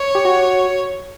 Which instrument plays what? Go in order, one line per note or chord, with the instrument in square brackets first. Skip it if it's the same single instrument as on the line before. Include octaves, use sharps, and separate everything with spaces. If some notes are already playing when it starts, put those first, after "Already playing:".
Already playing: [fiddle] C#5
[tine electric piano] G4
F#4